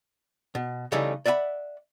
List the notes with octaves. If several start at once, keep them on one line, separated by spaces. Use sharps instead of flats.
B2
C#3 E3 G3 A3 D#4 G#4
D5 E5 F#5 G#5 B5